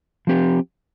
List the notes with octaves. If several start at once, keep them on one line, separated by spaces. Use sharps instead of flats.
F3 C4 G4